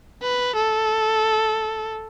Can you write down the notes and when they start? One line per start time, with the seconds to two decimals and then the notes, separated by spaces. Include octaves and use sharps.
0.23 B4
0.55 A4